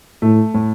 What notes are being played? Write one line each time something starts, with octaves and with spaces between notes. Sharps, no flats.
A2 A3
A2